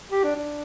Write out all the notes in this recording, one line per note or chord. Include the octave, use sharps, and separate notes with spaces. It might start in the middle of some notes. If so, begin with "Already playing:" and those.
G4
D4
D4